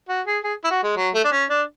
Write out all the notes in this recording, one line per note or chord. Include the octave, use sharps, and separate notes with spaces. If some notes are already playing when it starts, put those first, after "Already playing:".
F#4
G#4
G#4
E4
F#4
G#3
F#3
A3
D4
C#4
D4